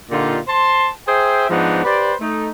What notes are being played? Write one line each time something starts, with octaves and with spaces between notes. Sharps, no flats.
A#2 D3 D#4 F4 G4
C5 A5 C6
G#4 C5 E5 G5
G#2 F3 B3 D4 D#4
G4 B4 C5 D5
A3 D#4